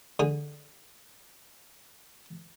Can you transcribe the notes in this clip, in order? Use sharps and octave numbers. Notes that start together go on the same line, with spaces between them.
D3 G#4